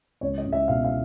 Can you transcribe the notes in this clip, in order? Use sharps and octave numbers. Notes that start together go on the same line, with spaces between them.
C#2 C#5
D#5
C#2
E5
B2 F5
F5